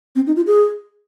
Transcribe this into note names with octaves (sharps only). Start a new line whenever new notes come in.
C4
D#4
F4
G#4